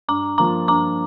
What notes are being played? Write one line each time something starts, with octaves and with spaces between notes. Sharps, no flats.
G2 A#5 D6
F3 A#3 F4 A#5 D6
G2 A#5 D6